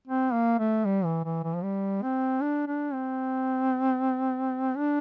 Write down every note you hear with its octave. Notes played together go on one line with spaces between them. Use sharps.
C4
A#3
A3
G3
E3
E3
E3
F3
G3
C4
D4
D4
C4
D4